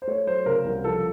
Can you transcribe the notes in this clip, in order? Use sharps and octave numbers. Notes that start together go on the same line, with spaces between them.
C5
A3 C#5
F#3 C5
C#3 A#4
C2
F3 A4